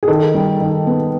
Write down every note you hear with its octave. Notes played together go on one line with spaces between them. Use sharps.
G#4
D#3 A4
G3
D#3
B3